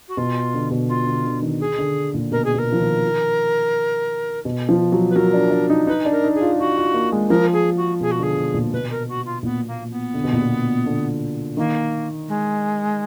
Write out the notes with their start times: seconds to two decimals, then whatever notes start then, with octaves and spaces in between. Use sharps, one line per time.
0.08 F#4
0.17 B2 F4
0.54 D3
0.71 B2
0.88 F4
1.06 D3
1.25 D3
1.42 D#3
1.60 G#4
1.78 D3
2.14 A#2
2.31 B2 A#4
2.44 G#4
2.54 B2 A#4
2.72 F3
2.78 D#3
4.45 B2
4.69 F3
4.92 F#3
5.10 B4
5.16 F#3 A#4
5.33 D4
5.51 D4
5.70 D#4
5.87 D#4 B4
6.05 D4
6.11 A#4
6.23 D#4
6.35 G#4
6.41 F4
6.58 F4 F#4
6.77 F4
6.94 A#3
7.12 G#3
7.29 F3 A#4
7.53 G#4
7.77 F#4
8.00 B2 G#4
8.11 F#4
8.19 D3 G#4
8.36 B2
8.54 A#2
8.73 B2 B4
8.90 A#4
9.08 F#4
9.25 F4
9.43 A#2 B3
9.67 A#3
9.91 B3
10.14 D3
10.24 B2
10.33 A#2
10.42 B2
10.86 D3
11.57 D#3 A#3
12.28 G#3